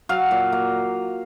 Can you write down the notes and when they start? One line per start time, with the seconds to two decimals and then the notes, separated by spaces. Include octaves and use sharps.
0.09 F#3 F5
0.31 A#2
0.52 A#3